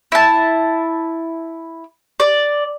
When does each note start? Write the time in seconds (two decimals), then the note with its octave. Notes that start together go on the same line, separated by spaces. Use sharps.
0.12 E4 A5
2.20 D5